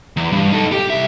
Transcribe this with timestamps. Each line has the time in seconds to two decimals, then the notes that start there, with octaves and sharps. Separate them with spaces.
0.17 E2
0.33 G2
0.52 D#4 A4
0.72 G4
0.90 C2 E5